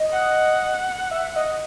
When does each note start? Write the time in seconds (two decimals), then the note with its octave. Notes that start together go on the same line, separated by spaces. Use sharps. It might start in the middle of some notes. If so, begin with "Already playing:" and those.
Already playing: D#5
0.11 F#5
1.11 E5
1.36 D#5